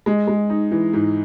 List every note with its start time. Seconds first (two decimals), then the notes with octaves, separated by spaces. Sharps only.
0.06 G#3
0.28 G#3
0.50 D#4
0.72 E3
0.93 G#2